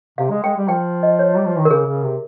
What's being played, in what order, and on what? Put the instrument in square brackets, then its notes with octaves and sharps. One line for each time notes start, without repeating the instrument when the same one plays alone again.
[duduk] C3 [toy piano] F5
[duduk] G#3
[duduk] G#3 [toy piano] G5
[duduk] G3
[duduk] F3 [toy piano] G5
[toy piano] D#5
C#5
[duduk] G3
F3
D#3
[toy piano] A#4
[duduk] C#3 [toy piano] G#4
[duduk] C#3
C3